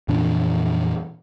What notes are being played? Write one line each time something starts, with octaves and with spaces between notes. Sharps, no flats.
F2 A#2 E3 D4